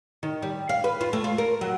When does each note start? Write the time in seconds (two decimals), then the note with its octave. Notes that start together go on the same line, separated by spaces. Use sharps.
0.23 D#3
0.42 G3
0.69 F5
0.84 B4
1.01 F4
1.13 A3
1.24 F4
1.38 A#4
1.61 F#3